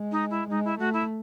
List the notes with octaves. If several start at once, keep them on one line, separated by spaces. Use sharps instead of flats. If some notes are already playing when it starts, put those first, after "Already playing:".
Already playing: G#3
D#4
E4
G#3 D#4
E4
A3 F#4
E4